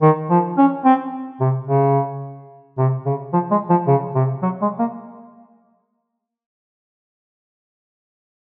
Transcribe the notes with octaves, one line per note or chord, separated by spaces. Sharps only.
D#3
F3
C#4
C4
C3
C#3
C3
C#3
F3
G#3
F3
C#3
C3
F#3
G#3
A#3